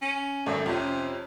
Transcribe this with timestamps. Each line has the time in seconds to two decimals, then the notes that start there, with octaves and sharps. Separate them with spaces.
0.02 C#4
0.46 G#1 F#2 A3 D5
0.66 F2 C3 C#4